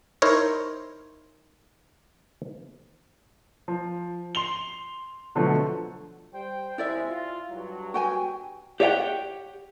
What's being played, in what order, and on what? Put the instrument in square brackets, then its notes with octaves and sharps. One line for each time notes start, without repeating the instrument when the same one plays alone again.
[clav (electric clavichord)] D#4 E4 A#4 C5 C#5
[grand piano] F3
C6 F7 G7
B2 D3 F3 F#3 A3
[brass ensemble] G3 C5 G5
[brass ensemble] C3 G#3 [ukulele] E4 D5 E5
[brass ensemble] F4
G2 F#3
[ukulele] F#4 G5 G#5
[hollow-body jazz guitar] G4 C#5 D5 E5 F#5 G5